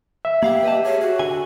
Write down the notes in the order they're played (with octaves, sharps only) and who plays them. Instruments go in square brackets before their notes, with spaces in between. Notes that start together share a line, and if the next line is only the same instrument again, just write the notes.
[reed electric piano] E5
[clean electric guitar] A#3 F5 F#5 [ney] G4
[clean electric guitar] B4 D#5 A5
[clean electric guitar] G#4 [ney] C#5
[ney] F#4
[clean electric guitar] D3 G#5